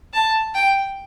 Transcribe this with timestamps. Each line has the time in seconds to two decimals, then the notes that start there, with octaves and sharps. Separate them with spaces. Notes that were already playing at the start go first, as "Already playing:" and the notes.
0.13 A5
0.54 G5